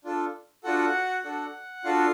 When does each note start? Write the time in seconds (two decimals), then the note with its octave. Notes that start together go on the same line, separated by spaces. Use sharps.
0.04 D4 F4 A4
0.64 D4 F4 F#4 A4 F#5
1.24 D4 F#4 A4
1.84 D4 F4 F#4 A4 F5